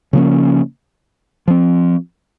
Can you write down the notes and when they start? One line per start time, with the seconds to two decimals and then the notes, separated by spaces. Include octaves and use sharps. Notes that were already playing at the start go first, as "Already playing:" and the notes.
0.13 C#3 F3 A#3 C#4
1.48 F3 C4